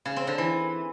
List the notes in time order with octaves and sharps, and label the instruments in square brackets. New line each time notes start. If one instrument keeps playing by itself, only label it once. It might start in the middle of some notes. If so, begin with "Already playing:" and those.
[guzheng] C#3
C4
D3
E3